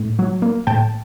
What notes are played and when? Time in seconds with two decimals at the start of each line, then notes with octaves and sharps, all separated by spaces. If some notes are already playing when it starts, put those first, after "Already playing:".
Already playing: A2
0.19 F#3
0.42 A#3
0.67 A2 G5 A5